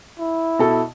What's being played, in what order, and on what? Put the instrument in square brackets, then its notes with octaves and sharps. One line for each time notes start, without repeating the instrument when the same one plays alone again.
[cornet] E4
[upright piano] B2 A4